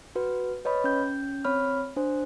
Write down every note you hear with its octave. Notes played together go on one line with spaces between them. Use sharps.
F#4 B4
B4 C#5 D#5 B5
C#4 G6
C4 C#5 B5 F6
D4 C5